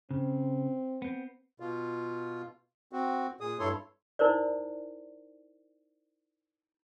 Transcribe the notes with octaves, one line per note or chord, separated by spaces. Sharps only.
C#3 C4
B3 C4
B2 F4
C4 F#4
A#2 G#4 D#6
G2 E4 A4 C#5 C6
D#4 E4 A#4 C5 D5